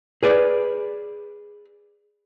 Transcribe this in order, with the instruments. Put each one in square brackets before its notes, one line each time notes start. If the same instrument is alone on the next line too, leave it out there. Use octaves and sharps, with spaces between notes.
[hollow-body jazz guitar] G#4 B4 D5